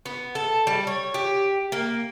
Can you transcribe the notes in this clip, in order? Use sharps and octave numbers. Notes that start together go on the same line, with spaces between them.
B3
A4
G3
C#5
G4
A#3